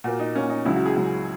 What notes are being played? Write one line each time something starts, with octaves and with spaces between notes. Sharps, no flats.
A#2 A#3 F#4
D#4
A#2 A#3 C#4
D#4
C#2 C#3 F#3 E4
F#4
G#4
C#2 C#3 F#3